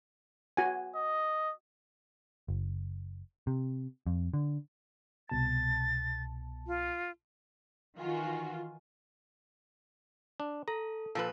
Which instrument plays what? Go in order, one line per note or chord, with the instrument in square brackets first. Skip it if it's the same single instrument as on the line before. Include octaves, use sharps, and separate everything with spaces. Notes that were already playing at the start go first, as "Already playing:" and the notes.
[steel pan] F#4 G#5
[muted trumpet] D#5
[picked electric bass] F#1
C3
F2
D3
[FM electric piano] C2 B2 A5 [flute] A6
[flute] F4
[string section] D#3 E3 F#4 [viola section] F4 [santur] G#5
[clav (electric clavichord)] D4
[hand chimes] A4 [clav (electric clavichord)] A#5
[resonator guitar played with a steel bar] A#2 F3 B4 [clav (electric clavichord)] A4